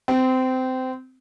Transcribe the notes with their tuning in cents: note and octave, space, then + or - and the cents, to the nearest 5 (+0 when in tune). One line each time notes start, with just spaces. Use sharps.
C4 -20